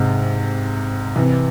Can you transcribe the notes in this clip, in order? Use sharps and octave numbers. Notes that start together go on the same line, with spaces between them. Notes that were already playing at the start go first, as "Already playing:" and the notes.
Already playing: G#2 C3
C3 E3